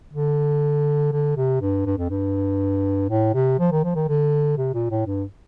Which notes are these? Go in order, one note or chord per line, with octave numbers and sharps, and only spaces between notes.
D3
D3
C3
G2
G2
F2
G2
A2
C3
F3
D#3
F3
D#3
D3
C3
A#2
A2
G2